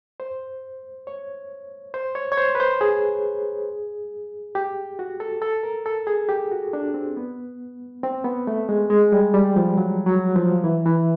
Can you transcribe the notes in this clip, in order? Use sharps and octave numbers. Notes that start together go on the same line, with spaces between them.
C5
C#5
C5
C#5
C#5
C5
B4
C5
G#4
G4
F#4
A4
A4
A#4
A4
G#4
G4
F#4
D4
C4
B3
C4
B3
A3
G#3
G#3
G3
G3
F3
F#3
F#3
F3
E3
E3